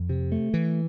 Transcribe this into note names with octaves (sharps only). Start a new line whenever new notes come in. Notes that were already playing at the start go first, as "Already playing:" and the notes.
Already playing: F2
C3
A3
E3